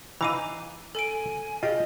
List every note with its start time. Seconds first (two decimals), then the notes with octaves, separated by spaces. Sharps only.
0.21 E3 D#4 F5 A#5 D6 D#7
0.95 A4 G#5 D7
1.63 F4 G4 G#4 D#5